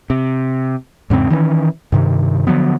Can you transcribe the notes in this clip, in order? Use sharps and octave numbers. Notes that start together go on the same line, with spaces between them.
C3
E2 G#2 C#3 C4
D#3 E3 B3 C#4
G2 C3 D#3
D3 F3 F#3 B3